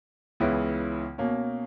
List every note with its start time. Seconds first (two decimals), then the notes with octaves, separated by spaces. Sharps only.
0.40 C#2 C#3 E3 B3 E4
1.18 B2 A#3 C#4